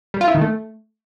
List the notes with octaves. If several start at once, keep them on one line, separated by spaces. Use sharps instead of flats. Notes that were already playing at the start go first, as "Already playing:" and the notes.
G3
F4
E4
D#3
A3